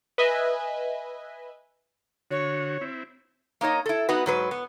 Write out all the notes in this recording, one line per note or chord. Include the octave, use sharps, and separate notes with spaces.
B4 D#5 E5 G#5
D3 F#4 C#5
C4 E4
A#3 D#4 C#5 D#5
E4 A4
B3 D#4 F#4 B4
G#2 F#3 B4
B3